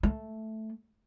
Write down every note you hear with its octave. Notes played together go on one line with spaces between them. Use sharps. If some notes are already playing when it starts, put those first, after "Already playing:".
A3